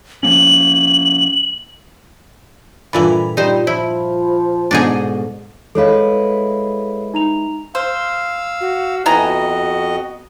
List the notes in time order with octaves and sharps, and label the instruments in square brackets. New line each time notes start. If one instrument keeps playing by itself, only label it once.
[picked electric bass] F3 A#3 C#4 [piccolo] F#7
[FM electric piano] G2 F4 B5 [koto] A#2 D3 E3
[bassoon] G3 [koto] D#4 C5
[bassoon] F3 [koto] E4
[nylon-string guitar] G#2 B2 A4 [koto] D4 D#4 G#4
[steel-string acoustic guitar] G#3 E4 B4 [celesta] A4 C#5 F5
[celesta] D#4 A#5 F7
[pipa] C5 [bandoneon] F5 E6
[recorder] F#4
[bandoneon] F2 D#5 [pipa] B3 E4 A#5 [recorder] G#5
[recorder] F#4